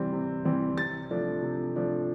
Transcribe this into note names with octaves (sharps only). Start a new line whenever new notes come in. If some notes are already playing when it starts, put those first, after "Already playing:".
Already playing: C3 E3 G3 C4
C3
E3 G3 C4
C3 A6
F3 A3 D4
C3
F3 A3 D4